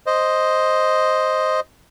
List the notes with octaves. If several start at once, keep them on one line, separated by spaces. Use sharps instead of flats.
C5 D#5